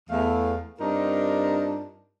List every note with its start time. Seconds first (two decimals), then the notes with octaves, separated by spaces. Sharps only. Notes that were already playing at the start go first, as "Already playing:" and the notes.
0.10 E2 A3 F5
0.80 G2 C4 D4 D#4 F4 A#4